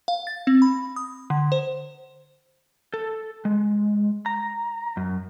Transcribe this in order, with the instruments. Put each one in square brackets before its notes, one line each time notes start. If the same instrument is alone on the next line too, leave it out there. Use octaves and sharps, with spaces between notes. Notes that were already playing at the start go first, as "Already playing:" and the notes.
[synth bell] F5
A6
C4
B5
D#6
D3
C5
[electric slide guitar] A4
G#3
A#5
F#2